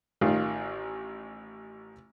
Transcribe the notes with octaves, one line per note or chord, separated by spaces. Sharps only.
A1 D#3 F4